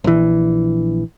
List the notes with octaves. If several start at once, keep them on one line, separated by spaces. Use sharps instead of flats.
A#1 E3